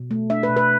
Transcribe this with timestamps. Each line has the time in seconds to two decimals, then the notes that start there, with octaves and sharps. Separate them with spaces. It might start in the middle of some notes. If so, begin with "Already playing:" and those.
Already playing: B2
0.11 A3
0.30 D4 E5
0.43 B4
0.49 B2
0.57 B4